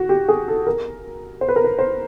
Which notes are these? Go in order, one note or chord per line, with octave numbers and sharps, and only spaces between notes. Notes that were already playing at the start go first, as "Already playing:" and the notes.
Already playing: F#4
G4
G#4
A4
A#4
C5
B4
A#4
B4
C5